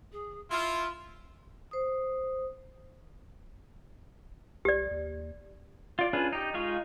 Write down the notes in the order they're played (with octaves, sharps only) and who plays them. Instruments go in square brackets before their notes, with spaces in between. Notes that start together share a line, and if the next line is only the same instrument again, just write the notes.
[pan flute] G#4
[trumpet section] E4 F4 [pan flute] C6
[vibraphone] C5 D#6
[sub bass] C2 [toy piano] G4 D5
[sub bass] D#2
[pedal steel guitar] F4 D5
C#4 D4 F4 G#4 B4
D#4 G4
G#3 D#4 F4 F5 C#6